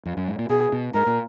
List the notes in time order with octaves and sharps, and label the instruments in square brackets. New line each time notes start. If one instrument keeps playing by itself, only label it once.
[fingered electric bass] F2
F#2
G#2
A#2
[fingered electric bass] B2 [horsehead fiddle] G#4
[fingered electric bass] B2
[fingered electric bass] G#2 [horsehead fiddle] A#4
[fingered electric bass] A#2